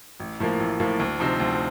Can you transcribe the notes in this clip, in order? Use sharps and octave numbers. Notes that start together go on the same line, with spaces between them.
A1
A2 F3 A#3
A1
A2 F3 A#3
D2
C3 F3 C4 D#4
D2